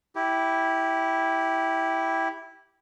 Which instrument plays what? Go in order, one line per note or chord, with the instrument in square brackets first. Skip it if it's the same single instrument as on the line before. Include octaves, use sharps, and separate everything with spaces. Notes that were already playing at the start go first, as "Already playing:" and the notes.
[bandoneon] E4 G4